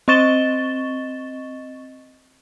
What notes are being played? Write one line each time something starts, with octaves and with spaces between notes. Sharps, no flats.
C4 D#5 C#6 A6 E7 G7